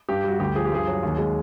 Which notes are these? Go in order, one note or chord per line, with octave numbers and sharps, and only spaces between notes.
G2 G4
G3 F#4
D2 G4
F3 G#4
G4
G2 G#4
F#3
D#2
G#3